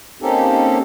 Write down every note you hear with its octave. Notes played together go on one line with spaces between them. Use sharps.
A#3 C4 C#4 D#4 G4 A4